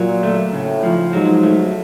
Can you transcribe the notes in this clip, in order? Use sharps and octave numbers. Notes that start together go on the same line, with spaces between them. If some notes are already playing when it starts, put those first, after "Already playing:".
Already playing: A#2 F#3
A3
A2 C#3
F3
G#2 F#3
A3